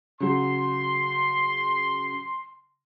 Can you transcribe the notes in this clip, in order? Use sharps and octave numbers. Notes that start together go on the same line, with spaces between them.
C#3 F#3 C6